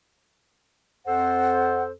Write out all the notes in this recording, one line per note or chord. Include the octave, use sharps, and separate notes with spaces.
F2 A4 C5 F#5